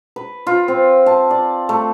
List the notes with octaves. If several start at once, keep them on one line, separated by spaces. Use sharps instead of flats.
B4
F4
C4
A5
D5
A3